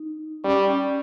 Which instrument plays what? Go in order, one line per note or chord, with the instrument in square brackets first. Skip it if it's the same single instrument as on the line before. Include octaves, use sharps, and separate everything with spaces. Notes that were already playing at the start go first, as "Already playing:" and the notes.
Already playing: [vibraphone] D#4
[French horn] G3 [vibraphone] C#4
[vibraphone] C#4